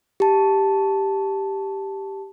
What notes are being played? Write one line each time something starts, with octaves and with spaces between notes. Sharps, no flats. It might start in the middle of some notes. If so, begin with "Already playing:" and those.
G4 A5